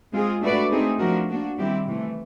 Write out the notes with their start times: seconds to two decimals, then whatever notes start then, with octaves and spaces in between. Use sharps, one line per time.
0.13 G#3 C4 F4 G#4
0.42 A3 D4 F#4 B4 D5
0.70 A3 C4 D#4 G#4
0.99 F3 A3 D4 F#4 A#4
1.28 A#3 D4 F#4
1.57 D#3 G3 C4 E4 G4
1.87 C3 E3 A3